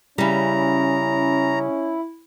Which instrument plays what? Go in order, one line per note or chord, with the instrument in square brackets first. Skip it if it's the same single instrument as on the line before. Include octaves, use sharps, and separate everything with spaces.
[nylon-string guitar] C#3 G3 [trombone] C#4 [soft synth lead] E4 [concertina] A#5